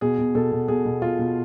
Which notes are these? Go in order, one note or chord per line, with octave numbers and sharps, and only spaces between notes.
B2 G#4
B2
B2 A4
B2
B2 G#4
B2
B2 F4
B2